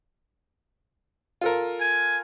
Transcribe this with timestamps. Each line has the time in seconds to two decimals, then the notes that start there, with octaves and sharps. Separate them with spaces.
1.41 F4 A4 A#4
1.80 G#5